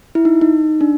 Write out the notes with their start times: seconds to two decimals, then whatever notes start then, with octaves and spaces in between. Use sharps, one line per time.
0.15 E4
0.25 D#4
0.41 D#4
0.81 D4